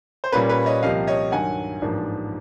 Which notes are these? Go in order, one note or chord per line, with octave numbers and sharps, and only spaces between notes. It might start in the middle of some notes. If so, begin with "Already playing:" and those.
C5
A#2 G3 A#3 C#4 B4
B4 C#5
C#5 D#5
C2 C3 F3 A#3 D#5 F5
C#5 D#5
G2 D#3 F#3 F#5 G#5
A1 G#2 F3 A#3 D4